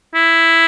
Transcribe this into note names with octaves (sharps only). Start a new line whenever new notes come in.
E4